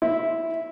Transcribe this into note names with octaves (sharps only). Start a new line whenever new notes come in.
E4